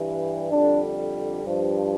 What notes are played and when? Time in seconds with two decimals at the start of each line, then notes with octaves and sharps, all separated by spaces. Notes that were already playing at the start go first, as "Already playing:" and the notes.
Already playing: G2 E3 G3
0.52 F2 D3 G3 D4
1.44 G2 F3